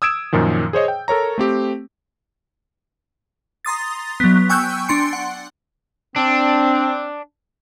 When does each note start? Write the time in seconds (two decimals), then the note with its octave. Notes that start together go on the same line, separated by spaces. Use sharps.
0.02 D#6 E6 G#6 D7 E7
0.33 F#2 A#2 D#3 F3
0.73 G#4 C5 C#5 D#5
0.88 G5
1.08 A4 A#4 C#5 A#5
1.38 A3 C4 G4
3.65 A#5 C6 D#6 A6
4.20 F#3 B3
4.49 G5 G#5 C#6 E6 F#6 G6
4.89 D4 C6 C#7
5.13 F#5
6.16 C4 D4